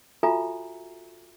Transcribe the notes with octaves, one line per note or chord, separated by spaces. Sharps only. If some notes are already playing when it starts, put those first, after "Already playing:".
F4 F#4 A4 E5 G#5 A#5